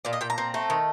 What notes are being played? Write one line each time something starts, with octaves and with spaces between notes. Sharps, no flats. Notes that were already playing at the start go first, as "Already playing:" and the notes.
A#2 D5
D#5
A#2 G5
A#5
C4
A3
D#3